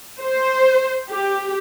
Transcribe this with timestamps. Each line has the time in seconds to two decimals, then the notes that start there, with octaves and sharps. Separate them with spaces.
0.20 C5
1.09 G4